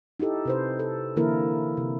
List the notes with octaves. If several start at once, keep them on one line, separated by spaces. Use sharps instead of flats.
D#4 E4 G4 A4
C3 B4 C5
A4
D3 E3 A#3 E4 A4 A#4
C3